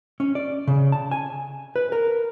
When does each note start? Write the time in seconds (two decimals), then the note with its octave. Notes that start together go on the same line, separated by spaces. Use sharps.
0.20 C#4
0.35 D5
0.67 C#3
0.92 A5
1.11 G#5
1.76 B4
1.92 A#4